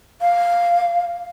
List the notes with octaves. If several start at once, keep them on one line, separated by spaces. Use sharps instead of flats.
F5